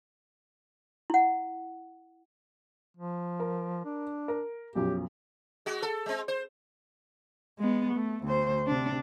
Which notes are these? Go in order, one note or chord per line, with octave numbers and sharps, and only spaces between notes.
E4 F#5
F3
A#4
D4
A#4
B1 F#2 F3 G4
G#3 F#4
A4
G#3 C4
C5
G#3 B3
A3
D2 C5
C3 D4